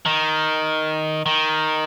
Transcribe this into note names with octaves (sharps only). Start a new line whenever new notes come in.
D#3
D#3